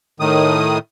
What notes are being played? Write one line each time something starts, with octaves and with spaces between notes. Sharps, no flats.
A2 D#3 D#6